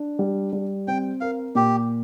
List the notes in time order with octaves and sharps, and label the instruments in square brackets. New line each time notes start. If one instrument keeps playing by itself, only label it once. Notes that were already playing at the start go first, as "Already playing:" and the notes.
Already playing: [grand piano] D4
G3
G3
[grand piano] C4 [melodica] G5
[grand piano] A#4 [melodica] F5
[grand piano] A#2 [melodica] G4